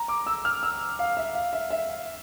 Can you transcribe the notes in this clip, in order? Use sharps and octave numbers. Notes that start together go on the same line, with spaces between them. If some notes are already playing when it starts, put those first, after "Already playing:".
Already playing: A#5
D6
E6
F6
E6
F5
E5
F5
E5
E5
F5